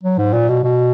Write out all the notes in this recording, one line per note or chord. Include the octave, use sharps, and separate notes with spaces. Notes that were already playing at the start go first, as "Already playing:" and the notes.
F#3
G#2
A#2
B2
B2